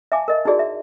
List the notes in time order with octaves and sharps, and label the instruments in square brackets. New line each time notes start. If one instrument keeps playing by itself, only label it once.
[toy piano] E5 F5 G#5 A5 D6
A#4 D#5
D#4 E4 F#4 G#4 D5
E5